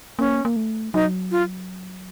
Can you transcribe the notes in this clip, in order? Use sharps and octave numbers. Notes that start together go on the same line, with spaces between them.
A#3 C#4
A#3
A3
F#3 D#4
F4